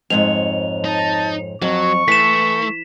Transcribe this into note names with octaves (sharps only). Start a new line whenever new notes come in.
F2 G#2 C#5 F7
D#4 A5
F2 F#3 C#6
E3 A3 B6 E7